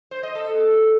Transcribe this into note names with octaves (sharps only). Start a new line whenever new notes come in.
C5
D#5
A4